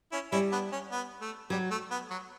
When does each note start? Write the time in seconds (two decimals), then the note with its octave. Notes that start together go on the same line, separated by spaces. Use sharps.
0.12 C#4 E4
0.32 G3 C#4 E4
0.52 B3 D4
0.72 C#4
0.91 B3
1.21 A3
1.50 F#3 G3
1.71 A3
1.91 B3
2.10 F#3